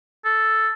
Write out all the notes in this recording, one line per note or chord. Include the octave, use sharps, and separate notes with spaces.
A4